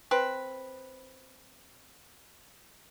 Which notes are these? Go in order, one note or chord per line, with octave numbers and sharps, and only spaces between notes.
C4 B4